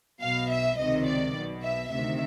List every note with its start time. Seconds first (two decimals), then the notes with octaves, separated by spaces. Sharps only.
0.20 B1 B2 F5
0.49 E5
0.77 C#2 C3 D#3 D#5
1.06 D5
1.34 B1 B2
1.63 E5
1.92 D2 C3 D#3 E5